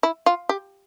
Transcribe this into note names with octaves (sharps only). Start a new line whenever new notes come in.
E4
F4
G4